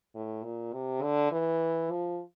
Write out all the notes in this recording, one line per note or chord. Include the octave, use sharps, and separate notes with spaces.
A2
A#2
C3
D3
E3
F3